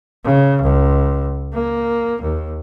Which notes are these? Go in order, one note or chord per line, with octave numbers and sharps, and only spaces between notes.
C#3
C#2
A#3
D#2